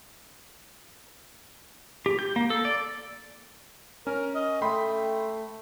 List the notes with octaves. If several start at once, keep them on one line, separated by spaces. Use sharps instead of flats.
G4
G6
A#3
A4
D5
C#4 A#4
D#5
A3 G5 B5 C6